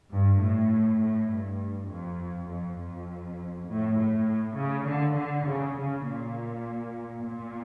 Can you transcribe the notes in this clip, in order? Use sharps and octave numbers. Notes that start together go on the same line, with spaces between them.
G2
A2
A2
G2
F2
F2
F2
A2
A2
C#3
D3
D3
C#3
C#3
A#2
A#2